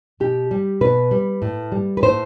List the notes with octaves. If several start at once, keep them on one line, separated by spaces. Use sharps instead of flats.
B2 G4
G3
B2 B4
G3
A2
G3
B4
A2 C5